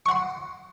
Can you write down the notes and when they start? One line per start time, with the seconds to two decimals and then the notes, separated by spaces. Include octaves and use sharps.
0.06 C#6
0.09 F#5
0.11 C6